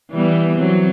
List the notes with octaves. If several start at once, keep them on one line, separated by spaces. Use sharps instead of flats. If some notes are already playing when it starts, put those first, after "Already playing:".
E3 G3 B3
F#3 C4